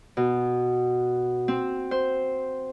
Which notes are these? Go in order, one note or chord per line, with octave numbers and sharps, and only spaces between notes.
B2
C4
C5